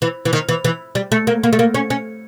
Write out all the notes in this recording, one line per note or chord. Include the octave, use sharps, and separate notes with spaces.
E3
E3
D#3
E3
E3
G3
A3
A#3
A#3
A3
A#3
C#4
C#4